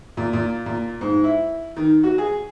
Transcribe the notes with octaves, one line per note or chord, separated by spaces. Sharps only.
A#2
A#2
A#2
G#2
E4
D#3
F#4
G#4